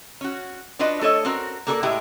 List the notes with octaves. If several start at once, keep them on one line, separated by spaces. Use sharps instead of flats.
C#4 F#4
D4 F4 F#4 B4 D#5
A3 A4 C#5 D#5
C4 C#4 F#4 A#4
A#3 F#4 A4 A#4 C5 D5
A2 G#3 E4 G4